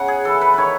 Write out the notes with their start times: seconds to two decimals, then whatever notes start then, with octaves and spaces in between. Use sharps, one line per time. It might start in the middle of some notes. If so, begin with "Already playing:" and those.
Already playing: C#3 F#5
0.08 G#4
0.25 E3 A4
0.41 B4
0.54 D#3 B4 C#5